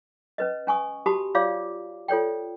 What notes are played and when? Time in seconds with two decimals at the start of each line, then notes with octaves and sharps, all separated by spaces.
0.38 C#4 B4 D#5
0.67 C#4 G#5 C#6 D#6
1.06 F#4 G4 A5 B5 D#6
1.35 F4 C#5 D5 F5 D6
2.08 F4 A4 C#5 D5 G5